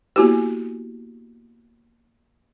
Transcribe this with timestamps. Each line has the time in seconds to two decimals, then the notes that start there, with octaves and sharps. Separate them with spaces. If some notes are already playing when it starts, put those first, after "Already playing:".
0.16 A#3 B3 E4 F#4 G4